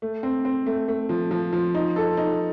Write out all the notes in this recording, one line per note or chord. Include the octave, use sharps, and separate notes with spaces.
A3
C4
C4
A3
A3
F3
F3
F3
D#4
A4
D#4